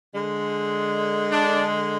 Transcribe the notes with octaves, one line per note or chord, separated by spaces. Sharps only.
D3 G#3
D4